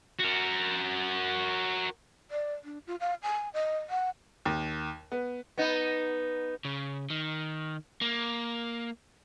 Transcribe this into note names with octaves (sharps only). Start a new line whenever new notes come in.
F#4 A#4
D5
D4
F4
F5
G#5
D#5
F#5
D#2
B3
B3 D#4
C#3
D#3
A#3